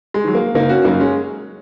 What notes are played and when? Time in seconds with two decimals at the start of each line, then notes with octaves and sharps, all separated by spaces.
0.14 G#3
0.24 D#3 F#3
0.35 A#3
0.55 F#1 A#3 D#4
0.69 C#4 F#4
0.84 F#2 C#3 F#3 A#3 D#4
1.00 G#3 C#4